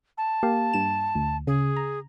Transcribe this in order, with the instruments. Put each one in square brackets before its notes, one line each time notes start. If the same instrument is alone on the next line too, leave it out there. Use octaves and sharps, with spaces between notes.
[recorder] A5
[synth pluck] A#3 G4 F5
G2 E7
D2
[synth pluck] C#3 [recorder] G#4
[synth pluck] A#5